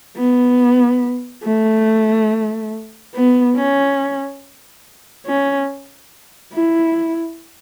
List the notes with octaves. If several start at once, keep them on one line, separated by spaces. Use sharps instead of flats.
B3
A3
B3
C#4
C#4
E4